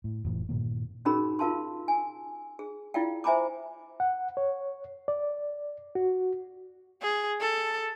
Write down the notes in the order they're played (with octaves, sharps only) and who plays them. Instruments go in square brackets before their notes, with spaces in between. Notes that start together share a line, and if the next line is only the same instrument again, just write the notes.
[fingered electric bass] A2
F1 A2 E3
G2 A#2 D#3 A#3
[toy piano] C#4 D#4 F#4 G#4 A#4 B5
F4 A#4 F5 A5 C6
G#5
G#4
E4 F4 D5 F5 G5
C5 E5 G#5 A#5 B5 D6
[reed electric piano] F#5
C#5
D5
F#4
[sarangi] G#4
A4